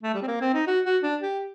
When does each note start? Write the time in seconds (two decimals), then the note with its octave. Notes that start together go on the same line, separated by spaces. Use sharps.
0.03 A3
0.14 G3
0.22 C4
0.27 A#3
0.41 C4
0.54 D#4
0.67 F#4
0.85 F#4
1.03 D4
1.21 G4